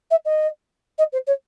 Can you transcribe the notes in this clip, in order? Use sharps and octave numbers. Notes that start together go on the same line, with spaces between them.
E5
D#5
D#5
C5
C#5